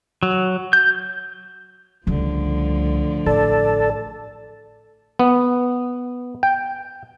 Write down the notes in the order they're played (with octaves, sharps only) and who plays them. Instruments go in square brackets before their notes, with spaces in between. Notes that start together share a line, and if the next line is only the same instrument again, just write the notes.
[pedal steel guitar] F#3
G6
[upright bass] C#2 G3 [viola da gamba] A2 D3 F3
[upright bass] A1 [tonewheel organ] A4 [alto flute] D5
[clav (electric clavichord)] B3
G5